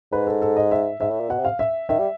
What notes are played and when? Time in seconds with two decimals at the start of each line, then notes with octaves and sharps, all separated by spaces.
0.12 G#2 B4
0.27 A4
0.42 A4
0.57 D#5
0.72 E5
1.00 G#2 E5
1.11 A2
1.20 A#2
1.29 B2 F#5
1.39 C3
1.45 F5
1.59 E5
1.89 D#3 E5
1.99 G3